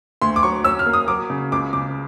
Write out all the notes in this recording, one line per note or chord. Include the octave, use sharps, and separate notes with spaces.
D2 C6
D6
F#3 C#6
C#4 E6
F6
A#3
D#6
F#3 D6
C#3
C#2 D6
C#3 D6